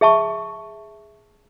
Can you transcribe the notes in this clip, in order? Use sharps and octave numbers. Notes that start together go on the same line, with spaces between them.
G#4 E5 A5 C#6